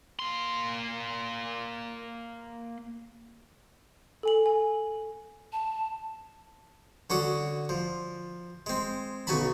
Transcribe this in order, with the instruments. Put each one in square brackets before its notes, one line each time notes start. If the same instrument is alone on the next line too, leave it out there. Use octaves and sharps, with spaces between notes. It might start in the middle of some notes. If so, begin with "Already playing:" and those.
[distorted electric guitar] A#3 C6
[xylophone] A4 G#5 F#7
G#5
[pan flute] A5
[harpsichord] D3 C#4 F#4 G#4
F3
G#3 C4
B1 C#3 F#3 G#5 A5 B5